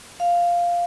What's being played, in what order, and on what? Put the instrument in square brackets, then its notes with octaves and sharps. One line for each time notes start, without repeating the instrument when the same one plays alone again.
[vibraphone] F5